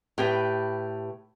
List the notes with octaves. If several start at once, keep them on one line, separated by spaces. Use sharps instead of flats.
A2 G4 B4